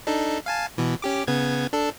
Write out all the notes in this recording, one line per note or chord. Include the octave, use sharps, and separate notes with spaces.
D4 D#4 A4
F5 G#5 A5
B2 E3
C#4 G4 D6
C#3 B3 G#6
D4 A4